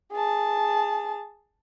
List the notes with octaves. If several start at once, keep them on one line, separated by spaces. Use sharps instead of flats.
G#4 A5